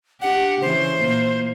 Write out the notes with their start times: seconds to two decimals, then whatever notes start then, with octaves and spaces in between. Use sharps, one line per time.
0.22 D4 G4 F#5
0.62 C#3 E3 C5
0.97 A#2 A#3